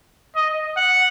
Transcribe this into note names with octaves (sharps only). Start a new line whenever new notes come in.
D#5
F#5